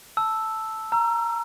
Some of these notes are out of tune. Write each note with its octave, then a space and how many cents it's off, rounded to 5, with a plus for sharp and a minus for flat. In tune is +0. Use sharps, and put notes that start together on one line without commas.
A5 +0 E6 +0
A#5 +0 E6 +35